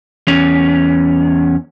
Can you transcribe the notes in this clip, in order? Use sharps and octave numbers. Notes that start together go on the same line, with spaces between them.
E2 C#4